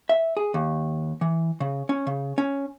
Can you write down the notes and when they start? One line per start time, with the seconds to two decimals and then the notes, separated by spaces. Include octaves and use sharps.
0.09 E5
0.37 G#4
0.54 D#2
1.21 E3
1.60 C#3
1.89 C#4
2.07 C#3
2.38 C#4